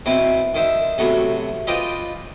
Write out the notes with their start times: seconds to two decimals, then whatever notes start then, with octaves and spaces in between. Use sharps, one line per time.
0.06 B2 C4 E4 B4
0.55 D#3 C5 E5
0.98 C3 F#3 A3 B3 F#4
1.67 F4 B4 C5 D5 D#5 G5